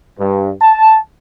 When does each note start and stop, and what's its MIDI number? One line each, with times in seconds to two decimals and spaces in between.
0.19 0.51 43
0.61 0.97 81